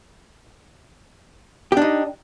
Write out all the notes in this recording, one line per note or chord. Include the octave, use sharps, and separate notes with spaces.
D4 D#4 G4